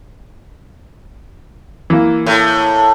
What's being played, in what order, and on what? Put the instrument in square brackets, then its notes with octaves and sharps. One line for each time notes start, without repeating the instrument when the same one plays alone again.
[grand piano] E3 A#3
[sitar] A2